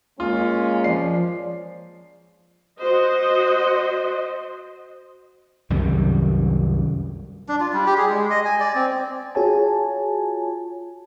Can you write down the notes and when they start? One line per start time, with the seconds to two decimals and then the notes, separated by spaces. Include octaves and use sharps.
0.20 G#3 A#3 C#4 F4
0.84 F3 D5 C7
2.80 F#4 C5 D#5
5.70 C2 F#2 D#3 G3
7.48 D4
7.60 F4
7.73 G3
7.86 G4
7.97 G#4
8.09 G#3
8.30 D#5
8.45 G#5
8.60 D5
8.75 C4
9.35 F4 F#4 G#4 C#5 G#5 A5